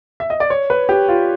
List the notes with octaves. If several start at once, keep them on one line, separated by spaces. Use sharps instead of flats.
E5
D#5
D5
C#5
B4
G4
F4